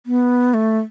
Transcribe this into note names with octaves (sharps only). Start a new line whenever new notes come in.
B3
A3